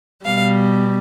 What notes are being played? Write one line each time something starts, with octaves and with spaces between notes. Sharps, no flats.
B2 G3 F5